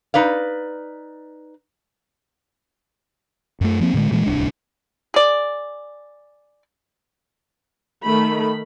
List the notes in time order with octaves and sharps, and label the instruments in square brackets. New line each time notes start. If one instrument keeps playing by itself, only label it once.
[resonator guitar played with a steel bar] D#4 B4 D5 F5
[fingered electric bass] F#2 A3
F3 A#3 C4
A2 D3 F3 G#3
A#2 E3 G#3 A#3
D1 C2 D4
[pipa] G#4 D5
[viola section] D#3 A3 B5